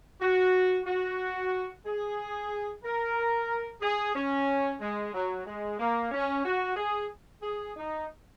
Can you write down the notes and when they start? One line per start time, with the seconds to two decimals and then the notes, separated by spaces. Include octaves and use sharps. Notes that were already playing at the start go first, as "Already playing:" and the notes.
0.21 F#4
0.86 F#4
1.85 G#4
2.83 A#4
3.81 G#4
4.15 C#4
4.80 G#3
5.13 F#3
5.46 G#3
5.79 A#3
6.11 C#4
6.45 F#4
6.76 G#4
7.42 G#4
7.76 D#4